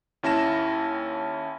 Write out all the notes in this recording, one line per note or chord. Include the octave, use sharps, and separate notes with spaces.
D#2 C#4 E4 A5 A#6 E7